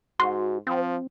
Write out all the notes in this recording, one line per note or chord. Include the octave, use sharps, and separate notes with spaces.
G#2 F#4 C6
F3 C4